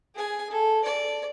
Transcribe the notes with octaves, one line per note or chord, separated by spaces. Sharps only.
G#4 G#5
A4
D5